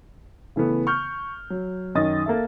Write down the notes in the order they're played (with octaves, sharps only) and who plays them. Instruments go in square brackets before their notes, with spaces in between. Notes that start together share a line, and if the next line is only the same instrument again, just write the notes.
[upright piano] C#3 E3 A3 B3
C#6 F6 G6
F#3
F#2 D#3 D#5 D#6 A6
A#3 A4 E5